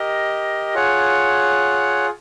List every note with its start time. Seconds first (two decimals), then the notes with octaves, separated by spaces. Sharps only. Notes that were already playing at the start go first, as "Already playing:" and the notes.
Already playing: G4 A#4 D#5
0.74 F4 G#4 C#5 F#5